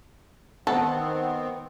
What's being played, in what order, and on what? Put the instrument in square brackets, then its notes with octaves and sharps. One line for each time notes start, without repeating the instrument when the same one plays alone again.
[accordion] D#3 B3 C4 [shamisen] A4 [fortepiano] F#5